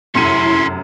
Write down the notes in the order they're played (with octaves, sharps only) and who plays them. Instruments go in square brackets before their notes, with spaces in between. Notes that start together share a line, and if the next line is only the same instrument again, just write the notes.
[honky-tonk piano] F1 F#2 D#7 [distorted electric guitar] C#4 A4 [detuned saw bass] E4 [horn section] C6